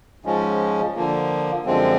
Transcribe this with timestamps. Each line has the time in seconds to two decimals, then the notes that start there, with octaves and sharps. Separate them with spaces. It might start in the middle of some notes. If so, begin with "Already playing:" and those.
0.25 G#2 F3 G#3 C#4
0.95 D3 F3 A#3
1.65 F#2 D3 F3 G#3 C4